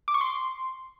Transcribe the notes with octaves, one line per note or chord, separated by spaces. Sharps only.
D6
C#6
C6